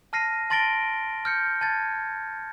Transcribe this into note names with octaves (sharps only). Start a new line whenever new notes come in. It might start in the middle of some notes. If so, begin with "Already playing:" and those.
A5 F6 A#6 C7 D#7
A5 C6 A6 A#6 D7 G7
F6 G6 C#7
A5 G#6 A6